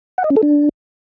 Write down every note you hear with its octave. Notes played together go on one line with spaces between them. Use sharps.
F#5
D#5
C#4
A4
D4